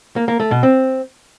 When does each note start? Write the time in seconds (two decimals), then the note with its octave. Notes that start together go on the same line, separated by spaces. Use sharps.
0.16 A#3
0.28 A#3
0.40 A3
0.51 B2
0.63 C4